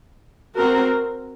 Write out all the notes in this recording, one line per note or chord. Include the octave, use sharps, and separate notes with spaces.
C4 F#4 A#4